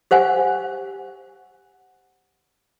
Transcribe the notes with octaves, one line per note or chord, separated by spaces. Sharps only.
G4 C5 F#5 G#5